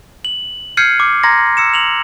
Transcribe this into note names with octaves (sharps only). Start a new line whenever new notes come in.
F#7
F6 G6 G#6 C7 C#7 D#7
D6
A#5 C6 G#6 A#6
E6 C#7 E7
F7 F#7